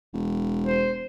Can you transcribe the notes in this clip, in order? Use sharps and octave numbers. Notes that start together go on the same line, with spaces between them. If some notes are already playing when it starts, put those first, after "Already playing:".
E1
C5